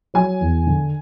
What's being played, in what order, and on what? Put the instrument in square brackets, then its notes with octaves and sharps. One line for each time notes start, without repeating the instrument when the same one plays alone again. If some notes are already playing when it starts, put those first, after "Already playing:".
[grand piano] F#3 [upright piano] G#5
[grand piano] E2
D3